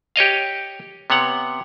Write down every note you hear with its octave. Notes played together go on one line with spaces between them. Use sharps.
G4 C#5 D#5 F5
C3 B3 C#5 F#5